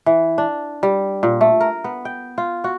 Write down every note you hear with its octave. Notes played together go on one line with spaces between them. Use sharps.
E3
D4
G3
A#2
A3
A#4
B3
G5
F4
F#4